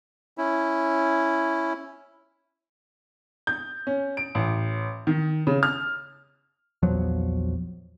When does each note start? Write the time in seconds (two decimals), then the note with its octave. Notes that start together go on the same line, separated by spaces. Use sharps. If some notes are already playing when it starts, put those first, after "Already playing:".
0.38 C#4 E4
3.47 G6
3.87 C#4
4.17 D7
4.35 A1
5.07 D#3
5.47 C#3
5.63 F6
6.82 A#1 E2 F3 F#3